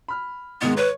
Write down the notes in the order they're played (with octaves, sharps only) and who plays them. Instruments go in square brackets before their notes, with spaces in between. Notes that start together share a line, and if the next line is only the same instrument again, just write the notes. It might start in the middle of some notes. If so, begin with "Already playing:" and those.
[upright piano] B5 F6
[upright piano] G#2 D#3 G#3 [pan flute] B3
[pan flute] B4 [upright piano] C#5